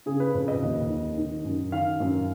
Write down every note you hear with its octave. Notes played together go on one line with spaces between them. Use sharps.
C#3 G#4
B4
F2
D#5
D#2
D#3
D#3
F#2
D#3 F5
F#2